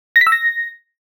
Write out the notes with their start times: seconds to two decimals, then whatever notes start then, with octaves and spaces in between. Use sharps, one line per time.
0.16 A#6
0.21 B6
0.27 E6
0.32 A#6